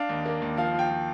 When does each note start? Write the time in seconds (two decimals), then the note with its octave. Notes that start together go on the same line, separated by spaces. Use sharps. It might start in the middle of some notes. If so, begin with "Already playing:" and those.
Already playing: D4 F5
0.09 D#2
0.26 A#3
0.42 D#2
0.57 F3 F5
0.74 F3
0.79 G5
0.90 F3